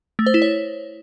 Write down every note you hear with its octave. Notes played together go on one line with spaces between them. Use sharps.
A3
C5
E4
C#5